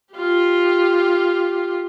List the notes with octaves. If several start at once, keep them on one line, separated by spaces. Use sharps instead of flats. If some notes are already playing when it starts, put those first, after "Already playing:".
F4 G4